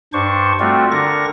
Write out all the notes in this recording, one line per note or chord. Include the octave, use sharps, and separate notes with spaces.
G2 D4 C5 C#6
G3 A3 C4 F4 F#4
D3 D4 A#4 C#6 A#6